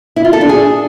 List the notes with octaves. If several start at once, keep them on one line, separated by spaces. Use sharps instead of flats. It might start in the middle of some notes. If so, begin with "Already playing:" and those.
E4
F4
A4
D4
G#4